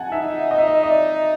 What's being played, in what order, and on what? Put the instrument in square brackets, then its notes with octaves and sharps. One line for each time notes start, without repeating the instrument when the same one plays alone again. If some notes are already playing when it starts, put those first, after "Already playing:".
Already playing: [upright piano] F#5 G#5 A5
[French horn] D#4 [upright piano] E5
[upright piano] D#5
E5
D#5
D#5
D5